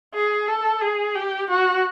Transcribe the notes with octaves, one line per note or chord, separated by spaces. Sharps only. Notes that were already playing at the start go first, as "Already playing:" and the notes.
G#4
A4
G#4
G4
F#4